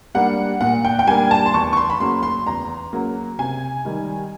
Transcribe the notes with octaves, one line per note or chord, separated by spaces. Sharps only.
G3 A#3 D4 F#5
A#2 F#5
G5
G5
G3 A#3 D4 G#5
A5
C6
E2 C#6
C#6
C6
B5
C#3 F#3 A#3 C6
C6
E2 A#5
C#3 F#3 A#3
C3 G#5
D#3 G3